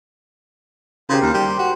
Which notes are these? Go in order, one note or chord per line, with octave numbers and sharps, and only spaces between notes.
C#3 G4 A#4 C5
D#2
G3
F#4